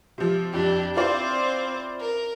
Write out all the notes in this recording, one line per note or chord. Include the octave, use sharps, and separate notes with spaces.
C3 F3
F2 C3 D4 G4
C4 E4 F4 C5 D5
A#4